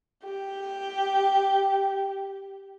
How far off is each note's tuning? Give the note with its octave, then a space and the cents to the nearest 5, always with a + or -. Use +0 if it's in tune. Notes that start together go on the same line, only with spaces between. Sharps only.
G4 +0